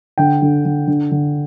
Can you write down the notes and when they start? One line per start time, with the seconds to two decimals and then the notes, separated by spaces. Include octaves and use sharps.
0.18 D3 G5
0.42 D3
0.65 D3
0.87 D3
1.11 D3